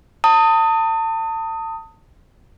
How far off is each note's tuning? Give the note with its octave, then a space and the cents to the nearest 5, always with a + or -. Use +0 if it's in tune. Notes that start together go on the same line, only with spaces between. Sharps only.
A5 +35 D#6 +10